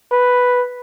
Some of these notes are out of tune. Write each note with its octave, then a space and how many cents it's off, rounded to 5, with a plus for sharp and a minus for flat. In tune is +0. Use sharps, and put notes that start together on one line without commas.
B4 +0